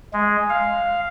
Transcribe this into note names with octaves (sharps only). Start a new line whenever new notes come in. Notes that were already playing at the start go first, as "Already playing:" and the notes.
G#3
F5